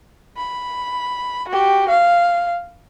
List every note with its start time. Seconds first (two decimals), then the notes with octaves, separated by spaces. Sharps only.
0.37 B5
1.48 F#4 G4
1.89 F5